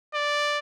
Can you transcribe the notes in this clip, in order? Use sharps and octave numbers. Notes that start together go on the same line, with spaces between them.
D5